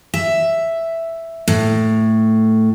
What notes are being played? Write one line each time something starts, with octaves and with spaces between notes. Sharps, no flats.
E5
A2